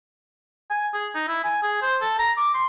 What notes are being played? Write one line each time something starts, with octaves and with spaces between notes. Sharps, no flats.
G#5
G#4
D#4
E4
G#5
G#4
C5
A4
A#5
D6
C6